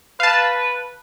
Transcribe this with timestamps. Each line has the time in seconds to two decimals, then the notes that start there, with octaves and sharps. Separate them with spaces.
0.20 B4 F5 A5